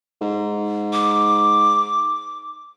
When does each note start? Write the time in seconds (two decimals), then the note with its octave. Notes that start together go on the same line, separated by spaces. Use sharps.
0.21 G#2
0.93 D6